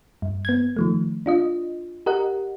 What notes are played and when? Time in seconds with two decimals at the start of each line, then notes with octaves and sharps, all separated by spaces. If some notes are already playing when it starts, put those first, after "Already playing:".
0.22 G2
0.45 B3 G#6
0.77 D#3 F3 A3
1.26 D4 F4 D#5
2.06 G4 A#4 D#5 F#5